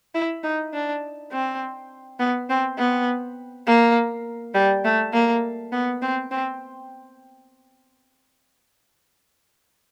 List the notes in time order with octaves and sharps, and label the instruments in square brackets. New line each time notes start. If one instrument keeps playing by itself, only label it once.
[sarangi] E4
D#4
D4
C4
B3
C4
B3
A#3
G3
A3
A#3
B3
C4
C4